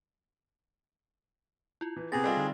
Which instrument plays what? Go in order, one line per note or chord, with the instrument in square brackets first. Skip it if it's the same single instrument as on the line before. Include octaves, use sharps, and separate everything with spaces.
[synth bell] E4 F4
[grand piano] E3
[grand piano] C3 B3 C4 [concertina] G#4 [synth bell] A6 A#6
[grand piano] G3 C4 F4 [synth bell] A4 D#5 F5
[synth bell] D3 D#4